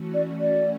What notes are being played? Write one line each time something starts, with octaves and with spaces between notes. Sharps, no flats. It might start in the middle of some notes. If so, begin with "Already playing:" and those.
Already playing: E3 A3 C#4 F#4
D5
D5